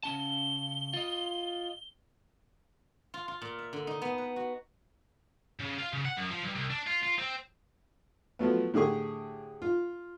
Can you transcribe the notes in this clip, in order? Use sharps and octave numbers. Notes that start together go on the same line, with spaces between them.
C#3 C#4 A5 G7
F4 D#5
F4
F4
A#2
E5
D3
D#4
B3
B4
F#4
C#3
F4
C#3
F#5
F#2
F3
G2
C2
D4
F4
F4
C4
F3 F#3 A3 B3
A2 D3 G4 G#4 C#6
F4